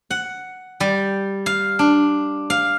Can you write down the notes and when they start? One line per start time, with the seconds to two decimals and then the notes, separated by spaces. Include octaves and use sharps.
0.11 F#5
0.80 G3
1.46 F5
1.79 D4
2.50 F5